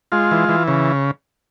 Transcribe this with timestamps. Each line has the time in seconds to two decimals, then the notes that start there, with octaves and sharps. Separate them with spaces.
0.12 G#3 F4
0.31 E3
0.49 E3
0.68 C#3